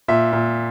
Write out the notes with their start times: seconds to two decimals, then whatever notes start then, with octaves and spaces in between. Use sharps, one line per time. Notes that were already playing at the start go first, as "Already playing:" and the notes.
0.08 A#2 E5
0.33 A#2